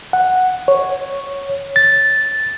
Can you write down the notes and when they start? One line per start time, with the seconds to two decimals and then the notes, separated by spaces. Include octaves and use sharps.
0.13 F#5
0.68 C#5
1.76 A6